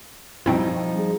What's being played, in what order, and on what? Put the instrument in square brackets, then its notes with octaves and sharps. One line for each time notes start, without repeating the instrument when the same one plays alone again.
[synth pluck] B2 C4 E4 [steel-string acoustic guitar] F3 D#4 [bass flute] G3
[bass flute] G#4